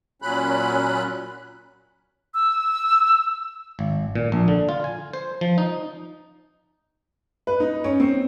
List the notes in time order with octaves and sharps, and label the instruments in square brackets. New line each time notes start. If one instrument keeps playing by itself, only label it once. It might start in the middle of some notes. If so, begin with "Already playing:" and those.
[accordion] A#2 F#3 C#4 B5 F#6
[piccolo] E6
[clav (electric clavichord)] G#1
A#2
A#1
D3
F4
G#5
C5
F3
D#4
[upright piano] B4
D#4
C#4
C4